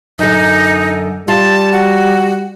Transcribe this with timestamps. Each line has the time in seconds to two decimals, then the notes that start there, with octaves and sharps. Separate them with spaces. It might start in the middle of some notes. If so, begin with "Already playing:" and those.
0.19 F#2 D3 D#4
1.28 G3 F4 A5
1.72 F#4